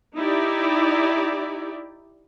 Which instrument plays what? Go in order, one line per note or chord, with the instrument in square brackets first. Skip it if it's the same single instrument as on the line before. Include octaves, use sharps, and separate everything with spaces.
[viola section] D#4 E4 G4 D5